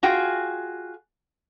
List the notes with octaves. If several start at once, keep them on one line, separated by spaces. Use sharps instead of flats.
F4 F#4 G#4 G5